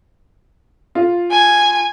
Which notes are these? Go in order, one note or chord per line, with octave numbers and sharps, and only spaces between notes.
F4
G#5